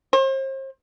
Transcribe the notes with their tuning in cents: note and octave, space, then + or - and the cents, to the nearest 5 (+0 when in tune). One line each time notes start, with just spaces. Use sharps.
C5 +40